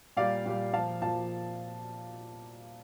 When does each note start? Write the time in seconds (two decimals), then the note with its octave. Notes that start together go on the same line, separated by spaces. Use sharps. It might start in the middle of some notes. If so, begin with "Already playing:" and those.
0.17 A#2 G3 D5 F5
0.46 A#2 G3
0.73 A#2 F3 F5 A5
1.02 A#2 F3 F5 A5